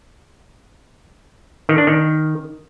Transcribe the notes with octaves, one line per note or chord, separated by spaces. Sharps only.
D#3
D4
D#3